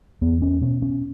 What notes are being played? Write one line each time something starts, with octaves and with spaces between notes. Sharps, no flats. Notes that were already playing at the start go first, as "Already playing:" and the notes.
E2 B3
C#4
B2 C#4
C#4